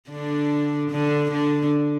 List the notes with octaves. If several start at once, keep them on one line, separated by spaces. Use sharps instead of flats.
D3 D4
D3 D4
D3 D4